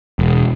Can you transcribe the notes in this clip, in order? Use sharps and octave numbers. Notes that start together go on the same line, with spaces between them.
E1